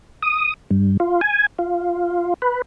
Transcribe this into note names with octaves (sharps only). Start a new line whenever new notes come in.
D#6
G2
F4
G#5
F4
B4